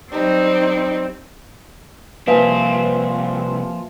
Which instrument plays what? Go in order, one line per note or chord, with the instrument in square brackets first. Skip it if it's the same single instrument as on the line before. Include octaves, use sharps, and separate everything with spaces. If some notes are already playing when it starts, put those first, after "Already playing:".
[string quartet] F#3 G3 D#4 [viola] C4
[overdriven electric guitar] C2 C4 [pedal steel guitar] F3 [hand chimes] A#3 E5 G#5 [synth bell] B4 F5